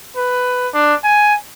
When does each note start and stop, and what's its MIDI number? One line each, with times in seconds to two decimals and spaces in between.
0.17 0.68 71
0.74 0.94 62
1.04 1.34 80